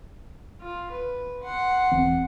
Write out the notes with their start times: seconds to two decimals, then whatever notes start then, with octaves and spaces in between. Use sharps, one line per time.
0.61 F4
0.92 B4
1.43 F#5 C6
1.92 E1 E3 C4